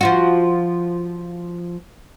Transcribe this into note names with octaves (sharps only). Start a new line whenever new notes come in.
F3 F4 F#4